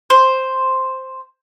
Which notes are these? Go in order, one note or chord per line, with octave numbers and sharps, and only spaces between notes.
C5